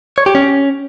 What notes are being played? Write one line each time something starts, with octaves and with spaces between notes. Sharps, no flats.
C#5
G4
C#4